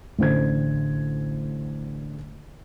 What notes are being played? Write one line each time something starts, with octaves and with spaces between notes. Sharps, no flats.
A1 D3 C5 G#6